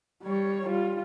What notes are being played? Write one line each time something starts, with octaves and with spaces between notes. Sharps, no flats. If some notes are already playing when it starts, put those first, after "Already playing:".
G3 C#5
G3 F4